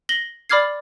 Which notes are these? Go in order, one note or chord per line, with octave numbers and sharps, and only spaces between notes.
A#6 F#7 G7
D5 B5 D6 F6 G#6 C7